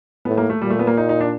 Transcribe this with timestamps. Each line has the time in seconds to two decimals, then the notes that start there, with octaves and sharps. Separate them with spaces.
0.25 A2 B3
0.37 A#3
0.50 A3
0.62 A#2 G3
0.70 A3
0.79 B3
0.87 A#3
0.97 D#4
1.09 D#4
1.21 D4